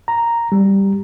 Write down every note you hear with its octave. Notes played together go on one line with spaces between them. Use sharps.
A#5
G3